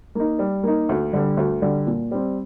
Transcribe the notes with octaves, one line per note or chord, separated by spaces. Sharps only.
A#3 D#4
G3
A#3 D#4
D2
D3 G3
D2
D3 G3
A#2
G3 C4